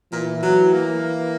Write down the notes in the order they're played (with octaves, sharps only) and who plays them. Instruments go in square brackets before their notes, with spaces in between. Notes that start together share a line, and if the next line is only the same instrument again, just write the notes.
[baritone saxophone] A#2 [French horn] E3
[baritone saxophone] F#3
A#3